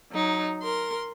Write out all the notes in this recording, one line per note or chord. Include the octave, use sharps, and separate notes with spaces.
F#3 D#4
A#4 C6